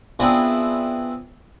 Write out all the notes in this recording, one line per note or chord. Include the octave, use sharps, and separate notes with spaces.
B3 C4 D4 E4 F4 G#4